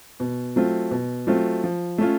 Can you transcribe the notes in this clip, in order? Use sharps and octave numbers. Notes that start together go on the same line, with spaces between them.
B2
F#3 A3 C4 F4
B2
F#3 A3 C4 F4
F3
A3 C#4 F4